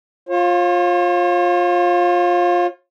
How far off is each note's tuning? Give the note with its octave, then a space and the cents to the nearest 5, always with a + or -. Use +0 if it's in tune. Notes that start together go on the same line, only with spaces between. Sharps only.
F4 +15 C#5 -40